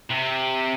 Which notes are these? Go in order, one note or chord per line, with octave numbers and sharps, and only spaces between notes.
C3